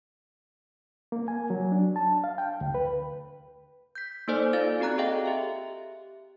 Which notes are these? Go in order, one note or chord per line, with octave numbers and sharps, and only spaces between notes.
A#3
G#5
F#3
D4
A5
F5
G5
D2
B4
G6 B6
A#3 D#4 A4 C5 D5 G#5
D#4 F4 A4 D5 F5 A6
C4 F#4 D5 A#5 F#6
G#4 A4 D#5 F5 G5
G4 E5